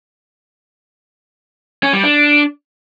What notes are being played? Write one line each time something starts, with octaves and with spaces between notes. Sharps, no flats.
C#4
G3
D4